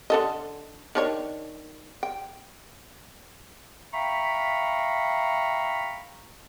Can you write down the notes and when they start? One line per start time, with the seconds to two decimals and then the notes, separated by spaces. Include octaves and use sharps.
0.10 D3 A4 D#5
0.95 D#3 D4 C#5
2.03 G5
3.94 E5 F5 G5 A#5 B5 C#6